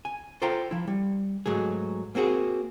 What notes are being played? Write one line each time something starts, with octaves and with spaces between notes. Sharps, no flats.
G#5
F4 A4 C5 F5 G5 A#5
F3 E4
G3
G#2 F#3 A3 G#4
A#3 C4 F#4 G#4